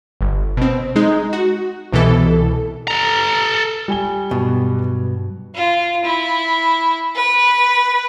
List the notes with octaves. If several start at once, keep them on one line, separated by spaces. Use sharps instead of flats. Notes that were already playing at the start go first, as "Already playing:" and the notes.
G1
B2 C4
G#3 D#4
F#4
C2 B2 E3 A4
A4 A#5
G3 G#5 G7
G2 B2 F#3
F4
E4
B4